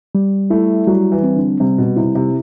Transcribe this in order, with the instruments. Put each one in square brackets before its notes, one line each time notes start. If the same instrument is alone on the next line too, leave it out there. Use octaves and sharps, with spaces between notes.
[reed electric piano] G3
[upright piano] A3 [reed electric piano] E4
[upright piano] F#3 [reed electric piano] G3
[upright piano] E3
[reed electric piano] C4
[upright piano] D3
[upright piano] C3 [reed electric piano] G3
[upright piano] B2
[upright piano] C3 [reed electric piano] E4
[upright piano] C3